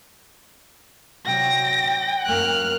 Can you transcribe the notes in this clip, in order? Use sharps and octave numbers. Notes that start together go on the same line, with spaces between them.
C3 F#3 G5 A#6
F#2 A#3 F6 F#6